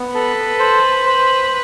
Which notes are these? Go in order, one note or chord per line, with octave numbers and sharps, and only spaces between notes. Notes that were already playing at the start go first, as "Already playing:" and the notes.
Already playing: B3
A4 B4
C5
C5